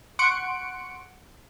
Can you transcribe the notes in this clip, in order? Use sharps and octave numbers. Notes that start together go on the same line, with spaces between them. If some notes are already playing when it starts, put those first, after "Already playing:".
F#5 C6 C#6 F#6 C#7 D7